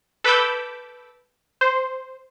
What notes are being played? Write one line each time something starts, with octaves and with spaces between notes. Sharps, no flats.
A4 B4 B5 D6 E6 G6
C5